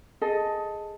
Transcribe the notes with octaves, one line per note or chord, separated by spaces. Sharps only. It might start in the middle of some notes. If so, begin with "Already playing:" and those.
G#4 A4 D#5